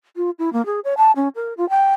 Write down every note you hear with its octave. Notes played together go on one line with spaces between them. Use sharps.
F4
E4
A#3
G#4
C#5
A5
C#4
A#4
F4
G5